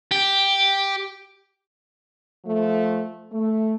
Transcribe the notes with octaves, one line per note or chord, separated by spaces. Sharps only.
G4
F3 A3
A3